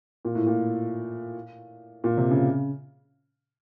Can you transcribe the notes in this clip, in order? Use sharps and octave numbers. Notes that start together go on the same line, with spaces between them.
A#2
A2
A#2
A#2
C3
C#3